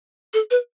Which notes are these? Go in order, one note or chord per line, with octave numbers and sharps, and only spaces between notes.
A4
B4